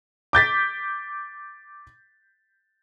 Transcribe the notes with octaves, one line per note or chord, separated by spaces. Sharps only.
D6 G6 A6 B6